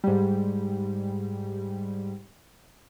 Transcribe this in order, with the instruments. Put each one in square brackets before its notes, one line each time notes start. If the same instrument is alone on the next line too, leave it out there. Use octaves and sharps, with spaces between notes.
[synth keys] G#2 G3